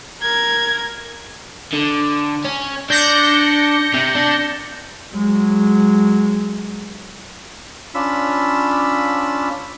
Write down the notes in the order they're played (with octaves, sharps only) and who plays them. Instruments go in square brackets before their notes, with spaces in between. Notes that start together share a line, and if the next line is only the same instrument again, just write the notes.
[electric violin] A#4 G#6
[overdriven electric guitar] D3
C#4
[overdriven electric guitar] D4 D5 [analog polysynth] G6 A#6 C#7
[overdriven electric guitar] C3
D4
[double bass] F#3 G#3
[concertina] C#4 D4 F4 B5 E6